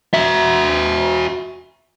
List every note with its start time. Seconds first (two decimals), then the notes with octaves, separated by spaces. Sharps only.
0.14 F#4 E5